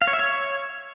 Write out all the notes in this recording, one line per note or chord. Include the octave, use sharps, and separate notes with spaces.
F5
C#5
E5
C#5